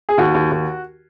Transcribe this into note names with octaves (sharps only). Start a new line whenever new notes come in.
G#4
D#2 F#4
D#2
D#2